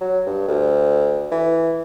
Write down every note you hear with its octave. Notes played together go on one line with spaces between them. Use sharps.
F#3
G2
D2
E3